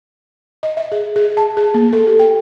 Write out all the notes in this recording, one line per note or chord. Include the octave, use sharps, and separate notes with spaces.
D#5
E5
G#4
G#4
A5
G#4
A#3
A4
G4
G5